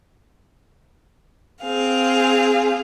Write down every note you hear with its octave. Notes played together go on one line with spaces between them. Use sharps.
C4 G#4 F5